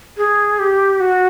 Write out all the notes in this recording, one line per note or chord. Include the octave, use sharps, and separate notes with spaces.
G#4
G4
F#4